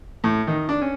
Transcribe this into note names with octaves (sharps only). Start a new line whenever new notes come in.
A2
D#3
D4
C#4